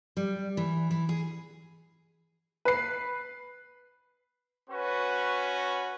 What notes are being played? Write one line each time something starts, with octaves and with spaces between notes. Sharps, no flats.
G3
E3
E3
G#4
B4 C7
C#4 F#4 B4